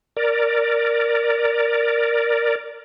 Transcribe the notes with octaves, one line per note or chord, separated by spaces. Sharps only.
A#4 D5